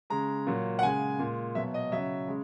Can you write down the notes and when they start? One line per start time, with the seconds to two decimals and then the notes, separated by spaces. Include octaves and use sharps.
0.10 C#3 G#3 A#5
0.46 A#2 F#3
0.79 F#5
0.82 C#3 G#3 G#5
1.19 A#2 G#3
1.55 B2 F#3 E5
1.74 D#5
1.92 C#3 F#3 E5
2.28 C#3 G#3